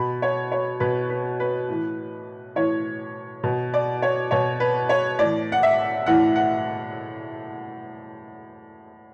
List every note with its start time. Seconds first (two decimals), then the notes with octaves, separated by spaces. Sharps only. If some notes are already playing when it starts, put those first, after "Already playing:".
Already playing: B2 B5
0.22 C#5
0.52 C#5
0.80 B2 B4
1.10 B4
1.40 B4
1.69 A2 E3
2.56 A2 E3 C#5
3.44 B2
3.74 D5
4.02 C#5
4.31 B2 C#5
4.60 B4
4.89 C#5
5.19 A2 E3 D5
5.52 F#5
5.63 E5
6.06 A2 E3 F#5
6.36 F#5